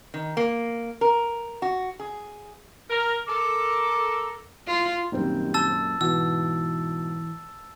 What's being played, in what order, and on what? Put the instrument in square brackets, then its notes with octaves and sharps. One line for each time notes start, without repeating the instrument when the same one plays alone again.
[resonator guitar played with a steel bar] D#3
A#3
A#4
F#4
G#4
[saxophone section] A#4
[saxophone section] A4 A#4 [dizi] D6
[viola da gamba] F4
[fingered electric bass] F#2 A#2 [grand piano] D#3 G3 C4
[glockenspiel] A5 E6 A6
[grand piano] G#2 B2 [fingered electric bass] E3 [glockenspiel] E6